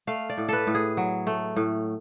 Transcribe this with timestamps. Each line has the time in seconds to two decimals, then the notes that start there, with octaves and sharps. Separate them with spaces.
0.07 A3 F5
0.29 D5
0.38 A2
0.49 A4 B4
0.67 A2
0.75 G#4
0.97 F#3
1.27 A3
1.56 A2